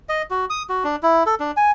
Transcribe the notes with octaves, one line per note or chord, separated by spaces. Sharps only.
D#5
F#4
D#6
F#4
D4
E4
A4
D4
G#5